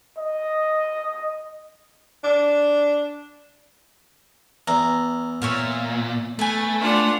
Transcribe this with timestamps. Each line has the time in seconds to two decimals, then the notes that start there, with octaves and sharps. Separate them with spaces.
0.18 D#5
2.24 D4
4.68 E2 A#5
5.42 A#2 C#5 E5 F5
6.39 A3 B4 G#5
6.79 D4 F4 F#5